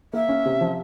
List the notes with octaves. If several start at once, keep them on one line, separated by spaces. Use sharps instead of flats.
A#3 E5
C#4
C3
F3